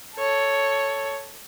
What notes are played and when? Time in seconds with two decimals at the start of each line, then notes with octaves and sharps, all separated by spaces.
0.16 A4 C#5